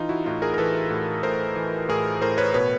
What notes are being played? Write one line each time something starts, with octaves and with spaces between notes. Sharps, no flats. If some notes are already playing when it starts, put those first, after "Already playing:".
Already playing: E3 D#4 F4
E4 F#4
A2 D#4 F4
G#4 A#4
A#4
E3 A4 B4
A2
A2 A#4 C5
E3
A2 G#4 A#4
A2 A#4 C5
B4 C#5
B2 B4 C#5